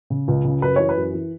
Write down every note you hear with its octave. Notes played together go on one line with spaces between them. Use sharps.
C#3
C#2
C#3
F#2 B4
E3 C#5
B4
F#2
E3